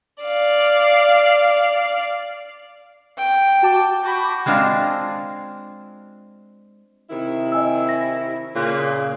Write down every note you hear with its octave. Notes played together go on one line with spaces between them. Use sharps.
D5 F5
G5
F#4 A5 D6
F#4 B5 D6 G6
G#3 C4 D4 F4
C3 D#3 E4
D#5 G#5 E6
A#6
A#2 C#3